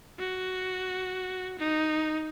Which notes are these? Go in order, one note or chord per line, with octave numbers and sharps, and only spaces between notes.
F#4
D#4